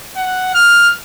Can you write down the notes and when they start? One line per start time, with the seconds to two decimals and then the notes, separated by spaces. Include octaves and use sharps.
0.16 F#5
0.55 F6